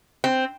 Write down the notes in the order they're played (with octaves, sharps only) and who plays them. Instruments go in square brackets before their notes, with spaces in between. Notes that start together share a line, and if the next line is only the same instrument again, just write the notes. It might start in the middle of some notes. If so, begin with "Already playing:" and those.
[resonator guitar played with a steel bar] C4